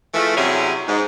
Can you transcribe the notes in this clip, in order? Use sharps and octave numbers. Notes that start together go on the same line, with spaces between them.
E3 F3 G#3 A3
C3 F#3 G3 C#4 E4 G#4
G#2